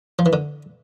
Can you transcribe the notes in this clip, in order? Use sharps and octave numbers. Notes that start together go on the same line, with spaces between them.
F3
E3
D3